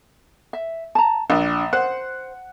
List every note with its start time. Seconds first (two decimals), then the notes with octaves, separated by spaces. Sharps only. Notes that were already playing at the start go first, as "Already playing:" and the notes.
0.53 E5
0.95 A5 A#5
1.30 A#1 D4
1.73 C5 F#5